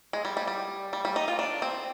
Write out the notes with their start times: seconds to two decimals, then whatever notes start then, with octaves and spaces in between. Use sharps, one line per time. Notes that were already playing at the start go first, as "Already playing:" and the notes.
0.13 G#3
0.25 G3
0.37 G3
0.48 G3
0.93 G3
1.05 G3
1.16 D#4
1.28 F4
1.39 D4
1.62 C4